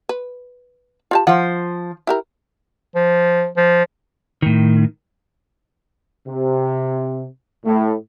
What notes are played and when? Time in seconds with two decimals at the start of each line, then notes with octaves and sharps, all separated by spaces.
0.09 B4
1.11 F4 G4 A5
1.27 F3 C5 F#5
2.07 E4 G4 A#4
2.96 F3
3.57 F3
4.42 A2 D#3
6.27 C3
7.64 A2